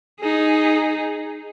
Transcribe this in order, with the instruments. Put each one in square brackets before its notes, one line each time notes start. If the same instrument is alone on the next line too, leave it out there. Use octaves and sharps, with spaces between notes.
[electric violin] D#4 G#4